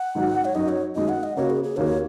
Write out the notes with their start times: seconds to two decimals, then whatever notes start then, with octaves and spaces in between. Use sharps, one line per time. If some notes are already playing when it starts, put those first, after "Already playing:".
Already playing: F#5
0.15 G#2 D#3 F#3 D#4
0.45 C#5
0.55 F#2 F#3 D#4 F#4 D#5
0.69 C#5
0.95 F#2 D#3 G#3 D#5
1.09 F#5
1.23 D#5
1.36 C#3 A#3 F#4 C#5
1.50 G#4
1.64 G#4
1.77 D#2 D#3 A#3 F#4 C#5